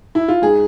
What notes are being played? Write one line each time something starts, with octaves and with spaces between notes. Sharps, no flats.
E4
F4
G#2 G#4